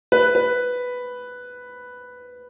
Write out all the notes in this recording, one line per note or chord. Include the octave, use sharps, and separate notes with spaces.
B4
B4